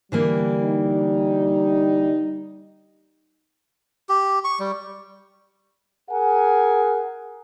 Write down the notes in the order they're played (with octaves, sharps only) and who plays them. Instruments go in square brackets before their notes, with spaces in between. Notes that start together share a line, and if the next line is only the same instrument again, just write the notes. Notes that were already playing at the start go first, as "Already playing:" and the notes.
[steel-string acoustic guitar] D3 E3 A#3 [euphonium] G3
[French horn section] D#4
[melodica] G4
C#6
G3
[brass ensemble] G#4 A#4 F#5 G#5